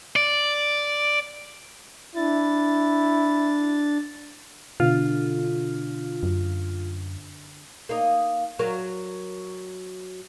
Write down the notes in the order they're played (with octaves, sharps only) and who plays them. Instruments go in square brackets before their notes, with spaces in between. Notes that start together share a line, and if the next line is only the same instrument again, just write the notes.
[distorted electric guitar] D5
[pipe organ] D4 A6 [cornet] E4
[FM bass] B2 [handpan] D3 [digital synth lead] F4
[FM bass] F#2
[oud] A#3 D#4
F#3 A#4